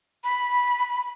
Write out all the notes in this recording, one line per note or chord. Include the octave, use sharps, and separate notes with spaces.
B5